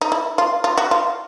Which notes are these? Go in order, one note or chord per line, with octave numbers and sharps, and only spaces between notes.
D#4
E4
F4
F4
F#4
F4